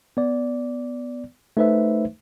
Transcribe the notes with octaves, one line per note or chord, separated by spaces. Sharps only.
B3 D5
A3 D#4 B4 C5 E5